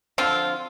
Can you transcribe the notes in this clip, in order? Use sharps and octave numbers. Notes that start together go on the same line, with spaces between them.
D3 F3 C4 F4